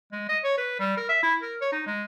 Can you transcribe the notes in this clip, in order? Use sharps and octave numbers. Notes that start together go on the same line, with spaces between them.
G#3
D#5
C#5
B4
G3
A#4
E5
E4
A#4
C#5
D#4
G#3